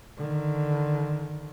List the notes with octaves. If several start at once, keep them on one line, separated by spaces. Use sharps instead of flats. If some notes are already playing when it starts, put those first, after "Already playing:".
D3 D#3